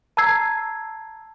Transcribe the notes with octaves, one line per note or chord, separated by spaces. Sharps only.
A5 A#5 E6 G#6 C7